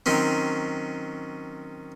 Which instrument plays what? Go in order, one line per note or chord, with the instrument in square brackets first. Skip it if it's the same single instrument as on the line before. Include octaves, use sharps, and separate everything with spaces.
[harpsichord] D#3 F#3 C4 C#4